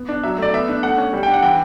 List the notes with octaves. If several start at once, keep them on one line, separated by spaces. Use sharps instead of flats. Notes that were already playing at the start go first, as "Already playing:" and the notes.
Already playing: B3
D4
F#3 E5
A3 D5
B3 E5
D4
A3 F#5
C#4
G3
G5
D4
F#5
E3 G5